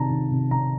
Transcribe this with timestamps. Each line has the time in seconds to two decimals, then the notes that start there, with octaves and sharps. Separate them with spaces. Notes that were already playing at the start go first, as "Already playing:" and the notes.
Already playing: C3 D#3 A5 A#5
0.10 D#3
0.31 C3
0.51 C3 A#5